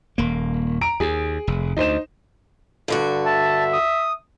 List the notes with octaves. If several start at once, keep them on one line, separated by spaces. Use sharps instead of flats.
D#1 A#3
A#5 D7
D#2 G#4
F1
D2 D#4 C5 E7
G2 D3 F#4
E5 A5
D#6